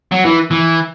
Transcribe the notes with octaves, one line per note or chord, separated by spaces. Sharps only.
F#3
E3
E3